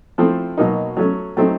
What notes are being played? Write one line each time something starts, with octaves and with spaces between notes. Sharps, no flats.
F3 A3 C4 E4
B2 F#3 A#3 D#4
F#3 A3 C#4
F#3 A3 C4 D#4